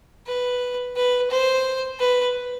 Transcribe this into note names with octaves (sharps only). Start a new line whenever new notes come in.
B4
B4
C5
B4